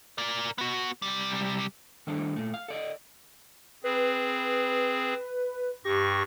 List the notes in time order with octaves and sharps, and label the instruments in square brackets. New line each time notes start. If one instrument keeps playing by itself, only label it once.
[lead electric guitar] A#4 D5
B3 F#4
C3 G3
[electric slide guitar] D#3 G3 A3 D4 A4 C5
A#2 A3
F5
A4 D5 D#5
[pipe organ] C4 G#4 [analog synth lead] B4
[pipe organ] G2 C#6 A#6 [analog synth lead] G4